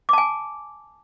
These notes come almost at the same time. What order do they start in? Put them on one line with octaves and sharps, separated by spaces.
D6 A5 G#5